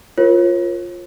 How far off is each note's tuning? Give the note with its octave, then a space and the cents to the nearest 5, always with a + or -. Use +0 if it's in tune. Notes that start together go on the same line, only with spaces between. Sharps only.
F4 +0 A#4 +15 C#5 -45